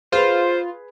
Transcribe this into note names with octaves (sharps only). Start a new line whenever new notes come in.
F4 G#4 B4 C5